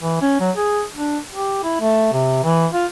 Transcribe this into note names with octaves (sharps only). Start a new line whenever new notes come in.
E3
C#4
F#3
G#4
D4
G4
E4
A3
C3
E3
F4